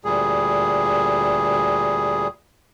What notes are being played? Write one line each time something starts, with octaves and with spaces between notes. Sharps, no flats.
D2 A#2 G3 G#4